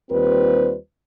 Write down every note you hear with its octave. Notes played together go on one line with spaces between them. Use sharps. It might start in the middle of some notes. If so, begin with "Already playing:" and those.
D#2 G3 C4 F4 B4 C5